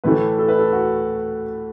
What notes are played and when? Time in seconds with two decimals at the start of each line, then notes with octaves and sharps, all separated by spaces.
0.04 A2 E3 A3 B4
0.39 A4
0.48 B4
0.59 A4
0.73 F#4